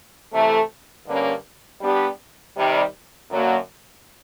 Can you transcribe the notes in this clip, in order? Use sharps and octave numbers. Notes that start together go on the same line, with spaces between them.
C3 E3 A3
G2 D3 G3 A#3 C#4
G3 B3 D4 G4
C3 D#3 G3
F#2 D3 F#3 A#3